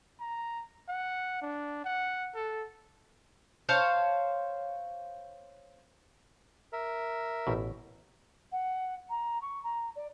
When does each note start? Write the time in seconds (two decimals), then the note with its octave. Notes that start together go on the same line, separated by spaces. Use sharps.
0.20 A#5
0.88 F#5
1.42 D4
1.85 F#5
2.35 A4
3.69 C5 C#5 F5 A5
6.73 A#4 E5
7.47 A1 B2
8.52 F#5
9.09 A#5
9.41 C#6
9.63 A#5
9.95 D5